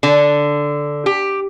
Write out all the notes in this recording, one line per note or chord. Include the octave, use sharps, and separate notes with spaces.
D3
G4